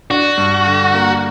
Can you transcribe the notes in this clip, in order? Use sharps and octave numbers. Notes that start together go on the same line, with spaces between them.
D4 F#4
G2
D3
A#3